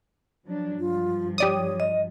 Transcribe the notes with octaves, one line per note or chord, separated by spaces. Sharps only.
F3 F#3 D4
G2 F3 F4
G4 C#5 D5 D#6
D#5